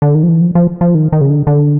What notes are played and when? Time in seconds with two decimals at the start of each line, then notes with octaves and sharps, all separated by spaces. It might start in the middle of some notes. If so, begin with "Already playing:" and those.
0.02 D3
0.15 D#3
0.23 F3
0.29 E3
0.41 F3
0.55 F3
0.81 F3
0.95 D#3
1.12 D#3
1.21 C#3
1.30 D3
1.47 D3